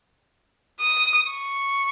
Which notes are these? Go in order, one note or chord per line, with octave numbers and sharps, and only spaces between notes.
D#6
C#6